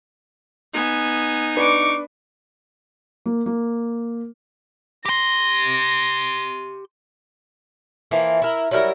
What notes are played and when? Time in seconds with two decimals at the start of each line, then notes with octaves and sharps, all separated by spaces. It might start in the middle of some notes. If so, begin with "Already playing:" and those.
0.74 B3 D#4 G#5
1.56 D4 B4 C#6 D6
3.26 A#3
3.46 A#3
5.05 G4 C6 A#6
8.11 E3 F3 A#3
8.42 E4 A#4
8.71 F#3 G3 E4 A#4